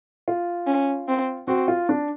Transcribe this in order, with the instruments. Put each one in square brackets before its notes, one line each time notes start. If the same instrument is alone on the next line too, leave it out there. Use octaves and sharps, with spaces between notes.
[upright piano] F4
[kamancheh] C#4
C4
[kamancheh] C4 [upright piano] F#4
[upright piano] F4
D4